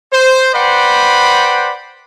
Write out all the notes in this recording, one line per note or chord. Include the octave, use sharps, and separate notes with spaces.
C5
B4 C5 D5 F#5 G5 B5